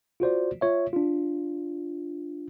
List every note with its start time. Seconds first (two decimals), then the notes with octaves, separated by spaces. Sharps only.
0.20 F4 F#4 C5 D5
0.61 F4 C#5 E5
0.93 D4 F4